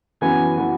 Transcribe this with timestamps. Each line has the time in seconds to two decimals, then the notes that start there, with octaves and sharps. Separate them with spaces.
0.22 F#2 E3 B3 F#4 G#5
0.57 E3 B3 F#4